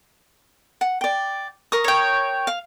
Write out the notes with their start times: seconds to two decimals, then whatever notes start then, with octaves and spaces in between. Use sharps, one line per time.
0.81 F#5
1.01 D5 G5
1.72 A#4 C#6 D#6
1.84 C#5 G5
2.47 F5